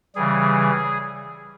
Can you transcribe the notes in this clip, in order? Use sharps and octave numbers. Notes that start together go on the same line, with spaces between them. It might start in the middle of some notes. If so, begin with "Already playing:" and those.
C#3 E3 G3 G#4